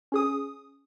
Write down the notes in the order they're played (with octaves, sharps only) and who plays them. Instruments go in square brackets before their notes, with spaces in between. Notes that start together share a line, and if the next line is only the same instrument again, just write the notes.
[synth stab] C#4 G#4 D#6